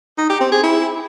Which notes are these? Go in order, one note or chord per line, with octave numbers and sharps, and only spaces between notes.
D#4
G4
C4
G#4
E4